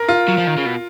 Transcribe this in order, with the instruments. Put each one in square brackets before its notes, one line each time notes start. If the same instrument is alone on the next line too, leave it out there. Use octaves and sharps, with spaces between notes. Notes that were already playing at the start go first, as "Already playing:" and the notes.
Already playing: [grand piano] A#4
F4
[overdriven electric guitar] F#3
F3
D#3
C#3
B2